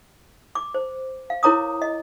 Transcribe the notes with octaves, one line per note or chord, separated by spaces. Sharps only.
D6
C5
F5
E4 A#4 C#5 A#5 D6 D#6
D#5